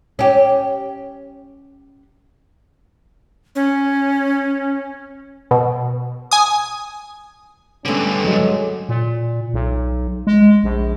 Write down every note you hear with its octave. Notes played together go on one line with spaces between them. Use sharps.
C#4 G4
C#4
B2
G#5 D#6
G2 D3 A3 B3 C#4
F#3 G#3
A#2
B1
G#3
A#1